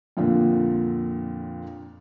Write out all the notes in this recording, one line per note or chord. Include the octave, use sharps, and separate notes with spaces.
F2 A#2 D3